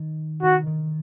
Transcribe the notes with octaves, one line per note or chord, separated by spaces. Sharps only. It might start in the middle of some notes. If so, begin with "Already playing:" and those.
Already playing: D#3
D#3 F#4
D#3